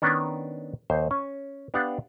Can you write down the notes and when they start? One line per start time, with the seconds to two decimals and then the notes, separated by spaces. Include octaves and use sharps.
0.02 D#3 B3 C#4 D4
0.90 D#2 C5
1.11 C#4
1.74 B3 D4 G4 F5 F#5